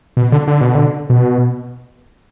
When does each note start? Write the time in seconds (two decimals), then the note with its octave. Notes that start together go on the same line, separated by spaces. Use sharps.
0.17 B2
0.32 D3
0.47 D3
0.61 B2
0.75 D3
1.10 B2